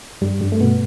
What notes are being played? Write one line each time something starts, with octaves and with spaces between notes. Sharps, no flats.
G2 G3
G2 G3
A3
B2 B3